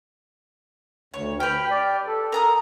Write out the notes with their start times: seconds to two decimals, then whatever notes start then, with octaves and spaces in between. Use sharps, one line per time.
1.14 D2 C#5
1.40 G4 B4 G5 F6
1.71 D5
2.07 A4
2.32 A#4 A#5 D#6